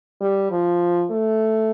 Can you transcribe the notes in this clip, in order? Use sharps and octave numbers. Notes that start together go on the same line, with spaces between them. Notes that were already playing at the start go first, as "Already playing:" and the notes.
G3
F3
A3